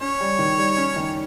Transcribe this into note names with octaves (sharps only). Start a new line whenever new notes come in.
C#4 C#5
G3
D#3
G3
C#4
D#3